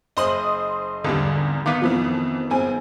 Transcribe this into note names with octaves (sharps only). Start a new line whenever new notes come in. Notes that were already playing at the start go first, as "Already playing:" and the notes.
F#1 C5 D#5 C6 D#6 F#7
G#1 E2 D3 G3
D#3 B3 F5 D6 B6
F2 E3 F3
F#1 C4 G#5